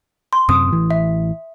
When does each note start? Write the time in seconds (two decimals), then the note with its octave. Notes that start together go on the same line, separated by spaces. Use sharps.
0.33 C6
0.49 F#2 C3 C4 D#6
0.69 A1 E3
0.91 E5